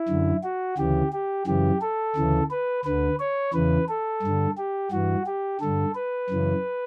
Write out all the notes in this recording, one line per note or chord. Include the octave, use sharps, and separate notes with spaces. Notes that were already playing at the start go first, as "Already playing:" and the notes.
Already playing: E4
F#2 D3
F#4
D2 C#3 E3 G4
G4
F#2 C#3 E3 G4
A4
D2 C#3 E3
B4
D2 D3 B4
C#5
E2 C#3 E3 B4
A4
G2 D3
G4
G2 E3 F#4
G4
G2 D3 A4
B4
F#2 C#3 E3